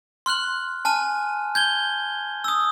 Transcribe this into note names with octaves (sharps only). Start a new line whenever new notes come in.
C6 F6 F#6 F#7
G#5 A5 F6 D#7
G6 G#6 G7
D#6 E6